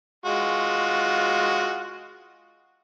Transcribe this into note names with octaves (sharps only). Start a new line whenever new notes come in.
G#3 F4 F#4